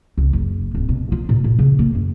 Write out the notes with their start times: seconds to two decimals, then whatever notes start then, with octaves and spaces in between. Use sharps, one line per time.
0.18 C#2
0.33 F#1
0.75 D1
0.89 B2
1.12 F4
1.29 A#2
1.44 A#2
1.59 C#3
1.79 A#3
1.95 F#2